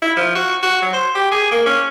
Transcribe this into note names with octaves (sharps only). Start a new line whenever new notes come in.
E4
F3
F#4
F#4
F#3
C5
G4
G#4
A#3
C#4